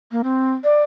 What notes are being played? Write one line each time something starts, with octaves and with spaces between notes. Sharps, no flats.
A#3
C4
D5